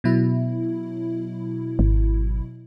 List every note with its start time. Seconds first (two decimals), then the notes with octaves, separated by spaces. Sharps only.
0.04 B2 F#3 E4
1.79 G#1